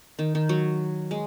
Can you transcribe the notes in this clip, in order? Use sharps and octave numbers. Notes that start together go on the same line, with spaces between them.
D#3
D#3
F#3
G#3